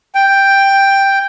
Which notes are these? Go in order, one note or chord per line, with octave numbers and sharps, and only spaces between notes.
G5